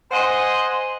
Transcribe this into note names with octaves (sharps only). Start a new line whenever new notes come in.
C5 D#5 F#5 G#5 C6